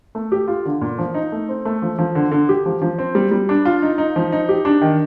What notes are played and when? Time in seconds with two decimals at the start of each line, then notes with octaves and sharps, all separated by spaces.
0.15 A3
0.32 G4
0.48 F4
0.65 D3
0.81 A#2
0.98 F3
1.14 D#4
1.32 A3
1.49 C4
1.65 A3
1.82 F3
1.99 F3
2.15 D3
2.32 D3
2.49 G4
2.66 F3
2.82 F3
2.99 C4
3.15 G3
3.31 G3
3.49 D4
3.65 F4
3.82 D#4
3.98 D#4
4.16 F3
4.32 D#4
4.49 G4
4.65 D4
4.81 D#3